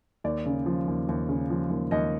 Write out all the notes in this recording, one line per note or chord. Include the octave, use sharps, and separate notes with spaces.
D#2 D5
C#3
F3
D#2
D#2
C#3
F3
D#2
D#2 D#5